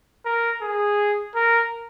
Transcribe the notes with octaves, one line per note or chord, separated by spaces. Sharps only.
A#4
G#4
A#4